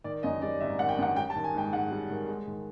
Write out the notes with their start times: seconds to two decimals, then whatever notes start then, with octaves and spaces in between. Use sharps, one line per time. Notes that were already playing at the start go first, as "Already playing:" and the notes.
0.04 D#3 D5
0.23 F#2 D#5
0.42 G3 D5
0.60 G#1 E5
0.79 D#3 F#5
0.89 G5
0.98 F#2 F#5
1.16 G3 G5
1.30 A5
1.36 D#3
1.44 G#5
1.54 G#2 G5
1.73 G#2 F#5
1.91 G3
2.10 D#3
2.28 G#3
2.47 D#3